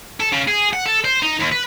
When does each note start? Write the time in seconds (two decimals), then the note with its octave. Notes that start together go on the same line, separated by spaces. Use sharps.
0.20 A4
0.32 C#3
0.48 G#4
0.73 F#5
0.86 A4
1.04 C5
1.22 D#4
1.40 D#2
1.52 B4